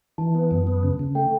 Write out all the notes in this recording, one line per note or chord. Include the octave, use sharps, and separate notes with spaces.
E3 A5
B3
F#2
B3
C#3
C#3
A3 G5